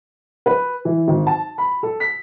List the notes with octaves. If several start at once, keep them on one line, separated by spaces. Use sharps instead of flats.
B4
E3
G#1
A5
B5
A4
B6